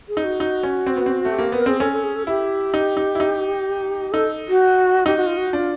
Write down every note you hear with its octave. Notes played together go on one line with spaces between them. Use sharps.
G#4
D#4
F#4
D#4
C#4
C4
B3
C4
A3
G4
A#3
B3 A#4
C4 G#4
C#4 A4
A4
G#4
A4
E4 G4
D#4
D#4
E4
D#4
D#4 A4
F#4
D#4 G4
F#4
F4
F#4
D4 F4